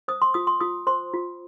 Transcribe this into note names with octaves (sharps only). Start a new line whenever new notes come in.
C5 D#6
C6
F4 D#6
C6
F4 D#6
C5 C6
F4